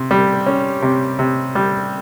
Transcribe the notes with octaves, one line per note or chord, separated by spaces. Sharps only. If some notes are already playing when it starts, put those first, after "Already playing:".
Already playing: C3
G3
C#4
C3
C3
G3